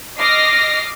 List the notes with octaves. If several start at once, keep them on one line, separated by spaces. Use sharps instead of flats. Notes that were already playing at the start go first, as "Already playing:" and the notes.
D#5 D6 F6 A#6 C7